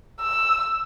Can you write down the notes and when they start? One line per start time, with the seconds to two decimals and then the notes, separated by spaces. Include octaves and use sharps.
0.21 E6